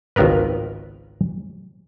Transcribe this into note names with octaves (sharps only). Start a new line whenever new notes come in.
G#1 C#2 B3 A#4 B4